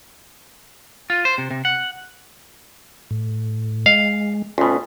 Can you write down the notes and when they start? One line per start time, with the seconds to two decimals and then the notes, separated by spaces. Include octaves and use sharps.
1.10 F4
1.25 C5
1.38 C3
1.51 C3
1.65 F#5
3.11 A2
3.86 G#3 F5
4.58 D2 B2 C#4 F4